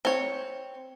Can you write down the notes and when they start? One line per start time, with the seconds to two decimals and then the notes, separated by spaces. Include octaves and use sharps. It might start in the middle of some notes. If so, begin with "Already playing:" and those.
0.05 C4 C#5